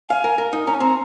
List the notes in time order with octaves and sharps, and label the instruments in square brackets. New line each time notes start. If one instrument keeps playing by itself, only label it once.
[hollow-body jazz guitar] F5 [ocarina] G#5
[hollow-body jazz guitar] A#4
A#4
D#4
[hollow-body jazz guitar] C#4 [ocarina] A#5
[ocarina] G#5
[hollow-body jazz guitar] C4 [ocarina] A#5